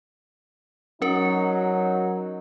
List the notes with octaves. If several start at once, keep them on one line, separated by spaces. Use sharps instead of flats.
F#3 C#4 D#4 A#4